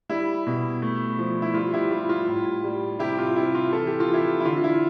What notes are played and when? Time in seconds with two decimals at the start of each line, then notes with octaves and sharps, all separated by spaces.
0.09 G3 E4
0.46 B2
0.82 A3
1.19 F3
1.42 E4
1.54 G3 F4
1.73 E4 G4
1.91 G3 F4
2.09 F4
2.28 A2
2.64 G3
2.99 C3 E4 G4
3.18 F4
3.36 C3 E4
3.55 F4
3.73 E3 A4
3.87 G4
4.00 F4
4.09 E3
4.14 E4 G4
4.40 E4
4.45 D3 F4
4.57 F4
4.64 E4